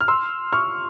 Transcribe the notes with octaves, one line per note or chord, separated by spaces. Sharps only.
F6
C6 E6
C#6 F6